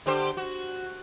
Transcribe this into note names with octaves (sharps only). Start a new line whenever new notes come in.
D3 G4 C5
F#4